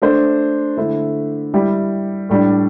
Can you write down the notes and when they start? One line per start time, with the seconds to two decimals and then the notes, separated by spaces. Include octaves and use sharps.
0.02 A3 D4 C5
0.77 D3 A3 E4
1.53 G3 E4 G4
2.29 A2 G3 D4